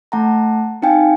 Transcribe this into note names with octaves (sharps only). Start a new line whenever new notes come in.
A3 F#5 A5 A#5
C4 D#4 F5 G5 G#5